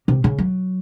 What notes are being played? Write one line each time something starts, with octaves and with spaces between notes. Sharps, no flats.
C3
C#3
F#3